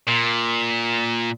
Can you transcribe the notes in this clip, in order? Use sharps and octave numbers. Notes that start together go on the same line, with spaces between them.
A#2